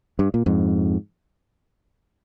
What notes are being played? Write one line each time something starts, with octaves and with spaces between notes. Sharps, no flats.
G2
A#2
F2 G#2